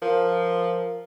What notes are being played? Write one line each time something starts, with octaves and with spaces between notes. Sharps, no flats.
F3 A#4